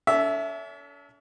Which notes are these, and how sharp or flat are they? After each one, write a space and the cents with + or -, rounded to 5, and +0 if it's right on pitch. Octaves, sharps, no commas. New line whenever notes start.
C#4 +45 A4 +15 E5 +0